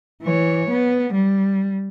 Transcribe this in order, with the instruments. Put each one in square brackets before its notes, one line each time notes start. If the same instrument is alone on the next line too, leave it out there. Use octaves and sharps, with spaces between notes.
[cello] E3 C#5
B3
G3